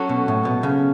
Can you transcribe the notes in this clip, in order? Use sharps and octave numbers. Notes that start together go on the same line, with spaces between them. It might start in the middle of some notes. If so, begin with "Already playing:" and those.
Already playing: F#3 C#4 F#4 A4
B2
A2
B2
C#3